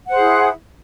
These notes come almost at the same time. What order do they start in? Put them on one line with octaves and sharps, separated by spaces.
F#5 C5 G#4 E4